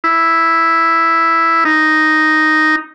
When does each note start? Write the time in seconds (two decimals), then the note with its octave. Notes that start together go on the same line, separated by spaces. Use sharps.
0.04 E4
1.65 D#4